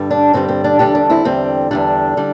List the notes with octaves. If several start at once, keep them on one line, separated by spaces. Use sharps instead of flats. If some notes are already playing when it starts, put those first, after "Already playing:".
Already playing: G2 D3 G3
D4
G2 D3 G3 C4
C4
D4
E2 D3 G3 D4 G4
D4
C4 E4
E2 D3 G3 C4
E2 D3 G3 D4
D3 G3